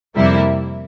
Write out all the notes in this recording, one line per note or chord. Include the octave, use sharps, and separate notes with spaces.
F2 C3 G3 A#3 E4